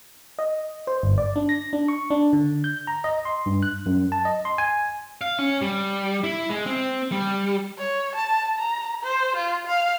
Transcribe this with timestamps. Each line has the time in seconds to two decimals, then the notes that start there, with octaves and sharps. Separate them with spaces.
0.39 D#5
0.87 C5
1.03 G1
1.18 D5
1.36 D4
1.49 A#6
1.73 D4
1.88 C#6
2.10 D4
2.33 D3
2.64 G6
2.87 A#5
3.04 D#5
3.25 C6
3.46 G2
3.63 F#6
3.86 F#2
4.12 A5
4.25 D#5
4.45 C6
4.58 G#5
5.21 F5
5.39 C#4
5.62 G3
6.24 E4
6.49 G#3
6.66 C4
7.12 G3
7.78 C#5
8.16 A5
8.59 A#5
9.04 C5
9.36 F4
9.67 F5